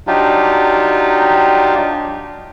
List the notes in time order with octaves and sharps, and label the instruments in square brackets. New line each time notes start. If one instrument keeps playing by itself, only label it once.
[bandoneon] F#3 D4 D#4 F4 G4